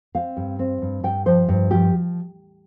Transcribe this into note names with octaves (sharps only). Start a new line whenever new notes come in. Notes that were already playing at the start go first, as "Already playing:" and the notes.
C4 F5
G2
C4
G2
G2 G5
F3 C5
G2
F3 G4